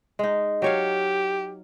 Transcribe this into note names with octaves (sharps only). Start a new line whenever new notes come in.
G#3 D#4
F#3 G4 C#5 F5